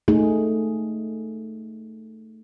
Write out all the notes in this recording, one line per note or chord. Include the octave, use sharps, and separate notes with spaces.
A3 D#4 G#4